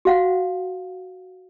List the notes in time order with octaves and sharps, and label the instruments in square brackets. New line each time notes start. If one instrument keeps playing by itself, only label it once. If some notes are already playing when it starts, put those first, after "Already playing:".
[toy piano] F#4 F5 F#5